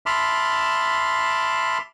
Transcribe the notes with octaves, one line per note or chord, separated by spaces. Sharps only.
E5 A5 B5 C6 D6 F6